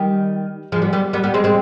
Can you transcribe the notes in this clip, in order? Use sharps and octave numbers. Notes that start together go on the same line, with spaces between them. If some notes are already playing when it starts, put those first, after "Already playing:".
Already playing: D#3 G3
F3 G#3
G3 B3
G3 B3
G3 B3
G3 B3
G#3 C4
G#3 C4